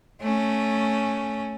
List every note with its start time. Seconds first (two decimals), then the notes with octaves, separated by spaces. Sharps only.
0.21 A3 C#4